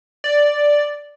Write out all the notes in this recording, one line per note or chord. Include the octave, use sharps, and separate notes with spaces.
D5